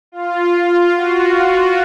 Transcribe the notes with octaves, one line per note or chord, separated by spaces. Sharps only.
F4
F#4